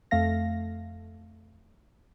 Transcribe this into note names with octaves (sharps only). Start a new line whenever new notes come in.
F2 A3 F5 A#6